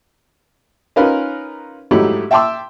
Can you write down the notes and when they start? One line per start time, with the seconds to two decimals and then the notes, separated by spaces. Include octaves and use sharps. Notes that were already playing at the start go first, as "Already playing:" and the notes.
0.96 C#4 D#4 F4 A#4 B4
1.91 G#2 F#3 A3 D#4 E4 G4
2.31 E5 G5 A5 C6 D6 E6